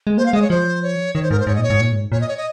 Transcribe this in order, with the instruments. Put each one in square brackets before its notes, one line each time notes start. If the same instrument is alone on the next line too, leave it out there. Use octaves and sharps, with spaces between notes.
[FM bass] G#3
[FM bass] A#3 [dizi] C5
[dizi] F5
[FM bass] G#3 [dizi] D#5
[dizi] C#5
[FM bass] F3 [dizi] C5
[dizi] C#5
[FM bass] D#3 [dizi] C#5
[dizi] C5
[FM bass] G#2 [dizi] A#4
[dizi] C5
[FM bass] G#2 [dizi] C#5
[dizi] D#5
[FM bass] A#2 [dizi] C#5
[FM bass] G#2
A#2
G#2
[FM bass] A#2 [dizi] C#5
[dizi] D#5
C#5
D#5